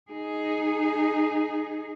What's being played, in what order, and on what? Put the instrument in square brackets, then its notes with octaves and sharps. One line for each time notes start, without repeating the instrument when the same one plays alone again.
[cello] D#4 G#4